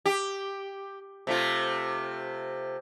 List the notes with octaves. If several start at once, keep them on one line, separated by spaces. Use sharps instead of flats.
G4
C3 A3 F4